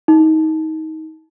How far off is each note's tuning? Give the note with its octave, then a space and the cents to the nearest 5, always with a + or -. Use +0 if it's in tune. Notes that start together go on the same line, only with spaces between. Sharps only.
D#4 +25